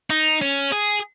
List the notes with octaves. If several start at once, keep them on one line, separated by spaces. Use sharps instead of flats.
D#4
C#4
G#4